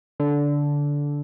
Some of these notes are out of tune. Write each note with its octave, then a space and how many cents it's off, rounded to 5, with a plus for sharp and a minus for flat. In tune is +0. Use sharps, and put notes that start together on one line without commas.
D3 -15